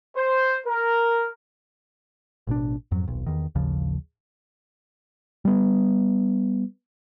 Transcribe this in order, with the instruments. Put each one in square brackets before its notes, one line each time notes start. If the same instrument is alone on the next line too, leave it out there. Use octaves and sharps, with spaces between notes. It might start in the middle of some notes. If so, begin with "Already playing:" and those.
[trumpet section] C5
A#4
[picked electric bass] A1 B2 D4
F2 G#2 F#3
D#1 B1
E2 D#3
A1 D#2 C#3 F3
G3 B3